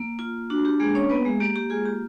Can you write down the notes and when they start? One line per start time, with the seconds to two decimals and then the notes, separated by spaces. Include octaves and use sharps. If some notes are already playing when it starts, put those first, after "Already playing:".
Already playing: A#3
0.19 F4
0.50 D4 F#4
0.65 G4
0.80 G#3 A#3 G#4
0.95 C#4 C#5
1.09 A#3 B3 B4
1.25 G#3 G#4
1.40 A#3 G4
1.56 G4
1.70 G#3 F4 G#4
1.86 G4